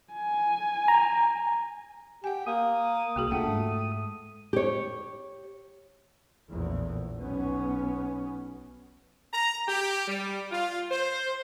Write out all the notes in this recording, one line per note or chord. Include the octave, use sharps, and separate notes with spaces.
G#5
A#5
G4 F#5 G#5
A#3 D#6
C2 A#3 F#4 G#4
D#1 A3 A#3 D4 F4 F#5 G5
G#2 G#3
G4 C#5
A#1 E2 A2
B1 B3 C#4
A#5
G4
G3
F4
C5